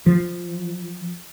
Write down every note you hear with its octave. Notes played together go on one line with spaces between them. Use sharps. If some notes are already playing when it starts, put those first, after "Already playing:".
F3